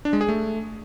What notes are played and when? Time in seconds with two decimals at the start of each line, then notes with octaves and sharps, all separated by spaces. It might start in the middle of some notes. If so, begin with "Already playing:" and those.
0.05 D4
0.13 G#3
0.21 G#4
0.28 A3